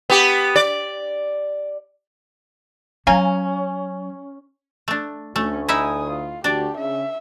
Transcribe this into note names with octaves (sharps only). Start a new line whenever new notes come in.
B3 G4
D5
F#3 C#4 F5 G#5 A#5
A3 D4
D2 A3 C#4
D#4 E4 E5 G#5 D#6
F4
D2 D4 F#4 G4 D5 A5
C#3 E5